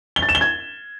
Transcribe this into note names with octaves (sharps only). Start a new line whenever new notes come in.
G7
A6
E7
G7
G#6